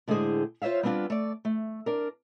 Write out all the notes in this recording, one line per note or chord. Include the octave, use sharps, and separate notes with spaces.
A2 D3 G#3 G4 G#4 C5
F4 C5 C#5 E5 F5
G3 B3 C4 D4 F4
A3 D5
A3
D4 A#4